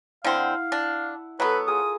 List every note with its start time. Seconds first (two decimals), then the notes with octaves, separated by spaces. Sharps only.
0.24 D3 C4 E4 F5 F#5
0.72 D4
1.40 F#3 B3 A4 B4 A5 E6
1.68 F4 G#4 A#4 D#6